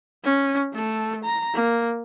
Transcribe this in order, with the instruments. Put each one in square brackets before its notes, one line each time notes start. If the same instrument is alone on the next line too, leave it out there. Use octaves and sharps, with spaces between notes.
[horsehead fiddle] C#4
A3 A4
A#5
A#3